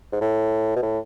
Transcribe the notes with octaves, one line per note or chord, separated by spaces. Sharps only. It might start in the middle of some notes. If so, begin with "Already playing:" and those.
G#2
A2
B2
A2